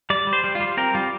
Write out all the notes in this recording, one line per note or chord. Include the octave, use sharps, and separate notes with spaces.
G3 D5
G3
C5
G3
F4
G3
C4 A#4
G3 F4